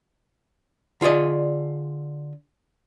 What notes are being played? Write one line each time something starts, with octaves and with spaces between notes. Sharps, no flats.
D3 F4 G#4 D5 D#5